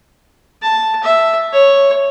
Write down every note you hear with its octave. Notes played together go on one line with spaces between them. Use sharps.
A5
E5
C#5